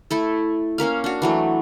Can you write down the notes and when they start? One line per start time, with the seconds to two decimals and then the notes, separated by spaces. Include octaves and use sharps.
0.11 A3 E4 A4
0.78 A#3 C#4 A#4 F5
1.04 D4 F#4
1.22 E3 F#3 A3